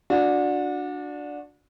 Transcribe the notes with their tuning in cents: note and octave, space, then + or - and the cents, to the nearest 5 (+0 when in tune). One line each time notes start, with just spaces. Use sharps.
D4 +0 F#4 -30